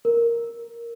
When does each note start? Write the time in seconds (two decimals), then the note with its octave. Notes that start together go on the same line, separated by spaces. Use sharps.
0.05 A#4